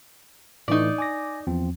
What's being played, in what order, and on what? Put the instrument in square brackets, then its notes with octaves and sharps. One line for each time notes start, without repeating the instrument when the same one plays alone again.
[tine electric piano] A2 E3 A3 [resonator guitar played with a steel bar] D#4 D5
[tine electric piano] G#5 D6 A#6
E2 F3 C4